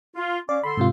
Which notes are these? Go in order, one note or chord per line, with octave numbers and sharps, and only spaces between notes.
F4
C#4 D5 F5 D6
D3 A4 B5 C6
G#2 C3 F4